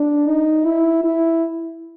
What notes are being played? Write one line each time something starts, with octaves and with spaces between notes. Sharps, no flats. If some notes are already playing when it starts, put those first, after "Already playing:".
Already playing: D4
D#4
E4
E4